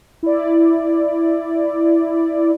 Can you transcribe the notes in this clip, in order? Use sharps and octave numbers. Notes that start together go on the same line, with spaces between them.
E4 D5